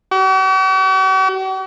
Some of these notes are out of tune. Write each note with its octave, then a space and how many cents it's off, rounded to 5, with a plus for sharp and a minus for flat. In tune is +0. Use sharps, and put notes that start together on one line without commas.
F#4 +45